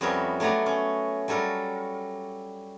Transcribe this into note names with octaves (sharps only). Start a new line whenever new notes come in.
F2 G3 B3 C#4 A#4 E5
F#3 A3 B3 D5 A#5
C#4
F#3 G3 A4 A#4